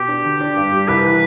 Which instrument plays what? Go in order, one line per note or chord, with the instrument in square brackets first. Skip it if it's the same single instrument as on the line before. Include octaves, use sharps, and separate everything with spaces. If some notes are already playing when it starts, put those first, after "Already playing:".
Already playing: [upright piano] B2 [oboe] G4
[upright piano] D4
D3
D4
G2
G3
[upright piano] C2 [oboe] B4
[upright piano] E3